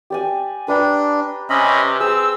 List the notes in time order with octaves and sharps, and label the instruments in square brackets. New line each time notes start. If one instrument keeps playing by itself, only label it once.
[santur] G4 D5 G#5
[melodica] D4 [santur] B4 G5 A#5
[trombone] C3 [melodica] C#4 D#5 B5
[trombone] C4 [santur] G#4 [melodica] E6